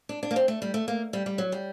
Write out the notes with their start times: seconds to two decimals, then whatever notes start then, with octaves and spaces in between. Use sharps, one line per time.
0.09 D4
0.23 D4
0.31 A#3
0.36 C4
0.48 A3
0.62 G3
0.74 A3
0.88 A#3
1.13 G3
1.26 G3
1.38 F#3
1.52 G3